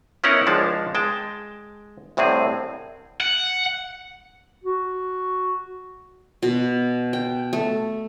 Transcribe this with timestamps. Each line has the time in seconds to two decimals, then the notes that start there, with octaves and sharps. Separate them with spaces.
0.24 B3 C#4 D#4 E4 A#4 F#5
0.47 C#2 F3 G#3 D4 F5 A5
0.95 G#3 G5 A5
2.17 C2 A2 C3 C4 G#4
3.21 F#5
4.64 F#4
6.43 B2
7.13 G5
7.53 A3